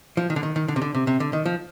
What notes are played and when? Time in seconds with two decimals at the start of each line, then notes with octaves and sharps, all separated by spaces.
0.17 F3
0.30 D#3
0.36 D3
0.43 D#3
0.56 D#3
0.68 D3
0.76 C3
0.82 D3
0.95 C3
1.07 C3
1.20 D3
1.33 D#3
1.46 F3